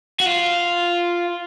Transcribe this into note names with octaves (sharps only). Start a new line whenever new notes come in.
F#4
F4